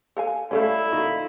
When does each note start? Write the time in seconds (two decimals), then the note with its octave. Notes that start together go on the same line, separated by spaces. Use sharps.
0.17 A4 F5 G#5
0.51 G3 A3 A#3 C#4 E4 A4 F5
0.92 F#2 D#3 D#4 F4